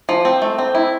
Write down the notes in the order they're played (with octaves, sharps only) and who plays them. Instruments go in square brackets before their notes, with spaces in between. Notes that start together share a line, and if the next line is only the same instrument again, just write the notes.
[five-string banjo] F3
C4
A3
C4
E4